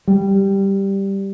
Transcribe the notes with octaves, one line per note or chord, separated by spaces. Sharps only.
G3